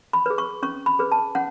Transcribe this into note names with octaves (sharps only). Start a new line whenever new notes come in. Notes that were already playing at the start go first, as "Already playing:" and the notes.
B5
G#4 B4
C#6
C#4 C#6
B5
G#4 B4
A5
C#4 F#5